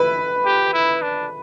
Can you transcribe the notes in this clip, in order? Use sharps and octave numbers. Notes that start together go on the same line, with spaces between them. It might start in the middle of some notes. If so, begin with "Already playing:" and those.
Already playing: E4 B4
G4
E4
D4